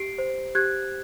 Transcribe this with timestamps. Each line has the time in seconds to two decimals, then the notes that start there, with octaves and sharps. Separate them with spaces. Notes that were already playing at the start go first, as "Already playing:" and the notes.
Already playing: G4 C7 D7
0.18 C5
0.55 G4 F#6 G#6